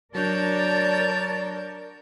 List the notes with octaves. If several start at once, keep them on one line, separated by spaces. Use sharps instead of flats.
F#3 D4 A#4 C#5 D5 A5 G6